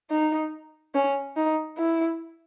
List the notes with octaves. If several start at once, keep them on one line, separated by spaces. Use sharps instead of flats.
D#4
C#4
D#4
E4